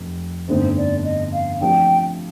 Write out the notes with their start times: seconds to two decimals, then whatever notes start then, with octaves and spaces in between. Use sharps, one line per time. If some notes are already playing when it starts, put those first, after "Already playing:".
Already playing: F1
0.48 G1 F2 D3 A3 D#4 C5
0.77 D5
1.04 D#5
1.33 F5
1.60 C3 F3 A3 D4 G5